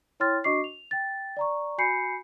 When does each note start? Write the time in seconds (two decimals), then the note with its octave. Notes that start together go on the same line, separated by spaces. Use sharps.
0.20 E4 C#5 G5 C6 F6 A6
0.44 D4 F#4 D#5 C#6 D6 C7
0.64 F7
0.91 G5 A6
1.37 D5 A#5 C#6
1.78 F#4 G#5 B5 G6 C7 C#7